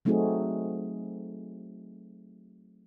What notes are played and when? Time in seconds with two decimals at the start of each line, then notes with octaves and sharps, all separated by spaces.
0.05 F#3 A3 C4 D#4 F#4 G#4